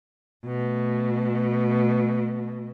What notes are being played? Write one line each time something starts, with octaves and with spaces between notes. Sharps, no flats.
B2 A3